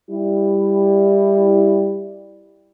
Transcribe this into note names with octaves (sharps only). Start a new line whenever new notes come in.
G3 E4